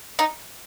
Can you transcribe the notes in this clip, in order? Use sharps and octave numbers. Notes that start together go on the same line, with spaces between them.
D#4